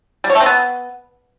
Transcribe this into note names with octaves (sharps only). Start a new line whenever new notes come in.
G3
C#5
A3
C4
B3